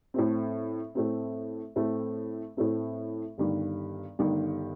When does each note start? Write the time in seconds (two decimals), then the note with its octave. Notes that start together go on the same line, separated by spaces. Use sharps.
0.14 A2 A3 C4
0.95 A2 A3 C4
1.76 A2 A3 C4
2.57 A2 A3 C4
3.38 G1 G2 D#3
4.19 G1 G2 D#3